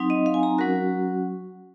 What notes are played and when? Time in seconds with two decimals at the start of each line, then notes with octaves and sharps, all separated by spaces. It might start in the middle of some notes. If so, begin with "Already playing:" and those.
Already playing: F#3 C4 D#4
0.10 D#5
0.26 F5
0.34 G#5
0.43 A#5
0.58 F#3 C#4 F#4 A#4